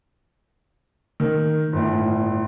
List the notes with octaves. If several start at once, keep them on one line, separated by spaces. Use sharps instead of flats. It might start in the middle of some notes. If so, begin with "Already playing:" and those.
D#3
G1 A2